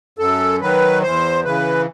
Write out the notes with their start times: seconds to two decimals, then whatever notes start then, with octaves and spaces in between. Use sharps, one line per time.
0.19 F#2 A4
0.61 D#3 F#3 B4
1.02 E2 C5
1.44 C#3 E3 B4